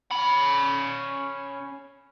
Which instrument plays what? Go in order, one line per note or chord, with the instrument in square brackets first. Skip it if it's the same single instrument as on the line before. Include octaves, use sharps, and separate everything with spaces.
[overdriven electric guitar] C#4 B5